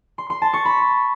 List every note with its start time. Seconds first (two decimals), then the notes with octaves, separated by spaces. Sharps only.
0.18 C6
0.30 C6
0.42 A5
0.53 C#6
0.65 B5